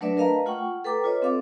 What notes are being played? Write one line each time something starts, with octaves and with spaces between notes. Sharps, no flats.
F#3 A3 D4 B4 D5 E5
A#4 B4 D#5 F5 A5 A#5
A3 F4 F#5 G5 C#6
A4 B4 G5 A#5 D6
F4 B4 C#5 D#5
C4 A4 F5 D6